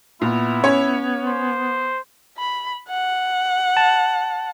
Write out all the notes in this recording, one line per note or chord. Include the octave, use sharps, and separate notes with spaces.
A#2 B3 E4
C#4 C#5
C5
B5
F#5
A5